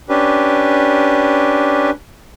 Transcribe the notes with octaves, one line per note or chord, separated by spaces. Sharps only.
C#4 D4 G4 B4